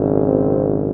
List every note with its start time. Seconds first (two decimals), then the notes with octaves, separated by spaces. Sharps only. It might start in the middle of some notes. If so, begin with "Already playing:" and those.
Already playing: G#1 F#2 C#3
0.23 C4